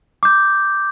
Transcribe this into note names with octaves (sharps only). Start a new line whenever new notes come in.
D6 G6